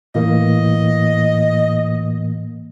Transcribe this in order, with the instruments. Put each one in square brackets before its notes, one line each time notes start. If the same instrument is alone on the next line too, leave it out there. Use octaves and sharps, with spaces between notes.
[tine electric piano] A2 E3 A#3 [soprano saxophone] D#5